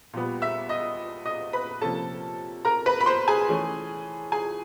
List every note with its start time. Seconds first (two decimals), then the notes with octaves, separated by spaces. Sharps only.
0.13 A#2 G3 B3
0.42 E5 E6
0.69 D#5 D#6
1.26 D#5 D#6
1.53 B4 B5
1.81 C3 F3 A#3 C#4 A4 A5
2.65 A#4 A#5
2.86 B4 B5
3.01 B5
3.06 C5 C6
3.28 G#4 G#5
3.49 E3 A3 C#4
4.32 G#4 G#5